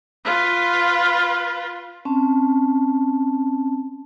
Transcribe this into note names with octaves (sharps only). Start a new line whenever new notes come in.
F4 B4
C4 C#4 A5